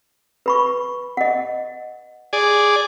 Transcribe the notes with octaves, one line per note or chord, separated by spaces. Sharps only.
B4 B5 C#6
D#5 F#5
G#4 D5